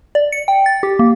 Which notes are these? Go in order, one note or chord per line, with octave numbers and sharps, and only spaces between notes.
D5
C#7
G5
A6
G4
A#3